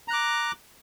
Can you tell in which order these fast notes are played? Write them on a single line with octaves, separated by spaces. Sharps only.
A#5 F#6 D6